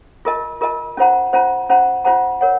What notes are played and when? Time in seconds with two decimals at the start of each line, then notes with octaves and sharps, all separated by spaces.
0.25 F4 A#4 D#5 A5
0.61 F4 A#4 D#5 A5
0.97 C#4 F4 C5 F#5 A#5
1.33 C#4 F4 C5 F#5 A#5
1.70 C#4 F4 C5 F#5 A#5
2.05 C#4 F4 C5 F#5 A#5
2.41 A#4 C#5 F#5